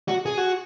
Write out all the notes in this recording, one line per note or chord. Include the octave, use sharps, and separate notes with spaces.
F#4
G#4
F#4